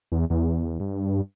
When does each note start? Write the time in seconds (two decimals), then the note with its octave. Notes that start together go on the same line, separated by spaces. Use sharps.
0.12 E2
0.30 E2
0.80 G2